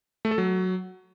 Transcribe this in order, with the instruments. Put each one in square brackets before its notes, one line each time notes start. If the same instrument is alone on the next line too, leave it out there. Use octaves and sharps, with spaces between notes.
[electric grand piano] A3
A4
F#3